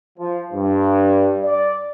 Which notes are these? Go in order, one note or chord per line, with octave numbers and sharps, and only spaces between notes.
F3
G2
D5